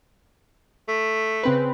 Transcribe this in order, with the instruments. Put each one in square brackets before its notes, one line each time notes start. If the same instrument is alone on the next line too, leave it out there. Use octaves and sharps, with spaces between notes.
[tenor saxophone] A3
[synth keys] C#3 C4 B4